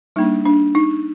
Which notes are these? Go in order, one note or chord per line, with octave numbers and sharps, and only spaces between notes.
G3 A#3 D4 D#4
D4
D#4